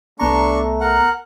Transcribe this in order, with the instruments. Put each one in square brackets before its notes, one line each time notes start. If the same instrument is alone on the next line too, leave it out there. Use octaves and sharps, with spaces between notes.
[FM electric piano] C2 B3 A#5 [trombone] A3 [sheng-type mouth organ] D4 C#6
[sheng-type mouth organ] A#4 F#5